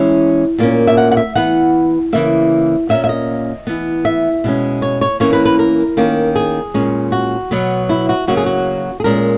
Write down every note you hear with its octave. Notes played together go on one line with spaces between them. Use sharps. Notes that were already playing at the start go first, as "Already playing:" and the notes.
Already playing: E3 G#3 C#4 E5
A#2 A#3 C#4
E5
F#5
F#5
E5
E3 B3 F#5
C#3 E3 A#3 E5
A#2 A#3 C#4 E5
E5
D#5
E3 B3
E5
B2 G#3 C#4
C#5
C#5
E3 A#3 C#4 C#5
B4
B4
A#4
D#3 A#3 C#4
G#4
A#2 G#3 C#4
F#4
B2 F#3 B3
E4
F#4
C#3 F#3 A#3 C#4 F#4
G#4
F#4
G#4
A#2 G#3 C#4 A#4